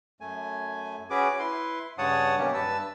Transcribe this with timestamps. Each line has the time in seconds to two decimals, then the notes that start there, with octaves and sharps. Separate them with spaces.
0.21 F#2 A3 G#5
1.10 C#4 F#4 G#4 B4 D6
1.39 E4 B4 C6
1.98 G2 C#3 C#5 F#5 A5 D#6
2.39 B2 D#3 F#3 A#3 C#4 G4
2.54 G2 B4 A5 E6